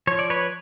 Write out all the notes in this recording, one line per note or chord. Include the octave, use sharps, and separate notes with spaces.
F3 C#5
D5
B4 C#5